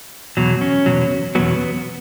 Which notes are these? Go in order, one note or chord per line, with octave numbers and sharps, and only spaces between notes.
E2 B2 F#3
C#4
E2 B2 F#3
E2 B2 F#3 B3